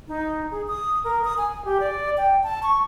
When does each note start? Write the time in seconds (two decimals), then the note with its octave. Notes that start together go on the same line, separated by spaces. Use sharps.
0.08 D#4
0.51 G#4
0.67 D#6
1.04 A#4
1.24 D#6
1.38 G#5
1.65 G4
1.80 D5
2.17 G5
2.43 A5
2.63 C#6